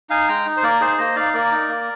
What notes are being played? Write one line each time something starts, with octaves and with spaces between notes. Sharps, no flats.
D#4 F5 G#5
G#3 G5 A#5
D#4
C5
A#3 A#4 D5
D#4 G#4 C5
A#3 C5 D#5
D#4 D5 F5
A#3 A#4 D5
D#4
A#3